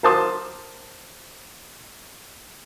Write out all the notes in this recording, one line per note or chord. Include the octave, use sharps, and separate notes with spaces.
A#4 C5 A5 C6 D#6